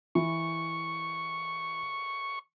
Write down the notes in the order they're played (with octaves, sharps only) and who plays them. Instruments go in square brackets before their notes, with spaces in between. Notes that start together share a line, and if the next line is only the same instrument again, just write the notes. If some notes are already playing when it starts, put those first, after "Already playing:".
[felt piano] E3 [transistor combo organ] C#6